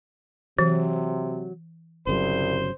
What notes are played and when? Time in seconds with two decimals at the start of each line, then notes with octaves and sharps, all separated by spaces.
0.59 C3 E3 F#3
2.07 G1 C2 C#3 F#3 C5